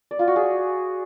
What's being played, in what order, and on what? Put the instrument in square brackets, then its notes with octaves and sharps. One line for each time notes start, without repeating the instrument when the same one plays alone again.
[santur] D5
F4
F#4
G#4